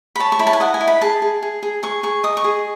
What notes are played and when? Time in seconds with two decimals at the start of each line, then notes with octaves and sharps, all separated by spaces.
0.16 B5
0.19 C#5 A5
0.32 C#6
0.39 E4 B5
0.47 A5
0.53 G#5
0.60 D#5 F#5
0.74 G#5
0.81 E4
0.87 B5
1.01 G#4 A5
1.22 G#4
1.42 G#4
1.63 G#4
1.83 G#4 C#6
2.03 G#4 C#6
2.23 D#5 D#6
2.37 C#6
2.44 G#4